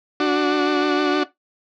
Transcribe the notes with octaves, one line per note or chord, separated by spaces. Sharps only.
D4 F#4